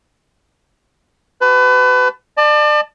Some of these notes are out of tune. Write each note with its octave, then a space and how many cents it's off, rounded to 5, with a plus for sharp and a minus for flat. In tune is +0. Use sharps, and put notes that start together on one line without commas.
F#4 +45 B4 +30 A5 +0
D5 +35 A5 +0